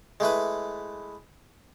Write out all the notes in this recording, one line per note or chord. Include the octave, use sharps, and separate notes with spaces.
G#3 A3 E4 B4